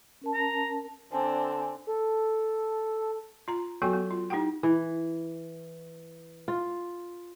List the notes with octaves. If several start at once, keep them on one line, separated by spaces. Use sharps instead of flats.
C#4 A#4 A5
A#5
D3 C4 D4 G#5 A5
A4
F4 A#5
F#3 B3 F#4 A4 G5 G#5
B3
F4
D#4 E4 G4 F#5 G5
E3
F4